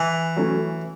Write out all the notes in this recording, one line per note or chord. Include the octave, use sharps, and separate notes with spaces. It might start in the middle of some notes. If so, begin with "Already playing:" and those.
Already playing: E3
F#3 A3 C#4 E4